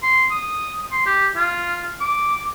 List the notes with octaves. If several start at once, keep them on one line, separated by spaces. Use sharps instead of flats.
C6
D#6
C6
G4
F4
D6